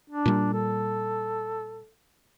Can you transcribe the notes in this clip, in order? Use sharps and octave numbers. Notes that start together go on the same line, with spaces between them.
D4
A#2 G3
A4